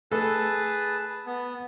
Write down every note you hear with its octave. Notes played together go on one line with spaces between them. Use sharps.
A3 G#4 A4 B4 A5
B3